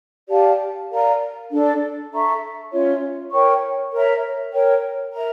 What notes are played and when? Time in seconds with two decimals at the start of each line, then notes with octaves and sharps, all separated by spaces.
0.30 G4 D5 F5 A5
0.91 A#4 D5 F5 A#5
1.50 D4 A4 D5
2.11 A4 E5 A#5 C#6
2.72 C#4 F4 C#5 E5
3.32 A#4 C#5 G5 C#6
3.93 A#4 C#5 E5 A#5
4.52 A#4 C#5 G5
5.13 A#4 E5 A#5